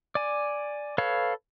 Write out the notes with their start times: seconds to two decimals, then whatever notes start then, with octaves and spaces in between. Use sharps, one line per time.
0.15 D5 G#5
0.98 A4 B4 C#5 F5